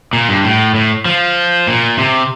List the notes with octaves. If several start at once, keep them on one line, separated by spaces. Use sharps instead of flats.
A#2
G2
A2
A2
F3
A#2
C3